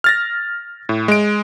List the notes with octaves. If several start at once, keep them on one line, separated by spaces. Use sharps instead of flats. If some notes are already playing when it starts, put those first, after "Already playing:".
F6 A6 A#6
A2
G#3 D7